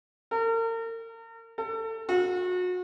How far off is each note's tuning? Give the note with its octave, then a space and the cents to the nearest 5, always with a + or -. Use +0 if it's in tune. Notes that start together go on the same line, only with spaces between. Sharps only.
A#4 -40
A4 +30
F#4 -35